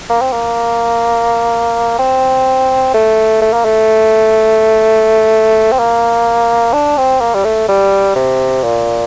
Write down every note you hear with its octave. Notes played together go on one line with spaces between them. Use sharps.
A#3
C4
A#3
C4
A3
A3
A#3
A3
C4
A#3
D4
C4
A#3
G3
A3
G3
C3
A#2